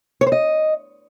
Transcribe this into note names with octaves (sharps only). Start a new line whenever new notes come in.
C#5
C5
D#5